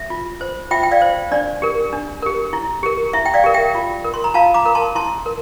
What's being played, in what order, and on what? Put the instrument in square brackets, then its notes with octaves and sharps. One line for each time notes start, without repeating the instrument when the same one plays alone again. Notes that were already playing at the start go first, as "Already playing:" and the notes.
Already playing: [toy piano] E5
F4
C5
F4 E5 G5
G5
D5 F5
C5
D4 D5
G4 A#4
D4
G4 A#4
E4
G4 A#4
E4 E5
G5
D5 F5
G4 A#4
E5 G5
F4
A#4
C6
A#5
F4 F5 A5
A#5 D6
A#4
A5 C6
E4 A5 C6
A#4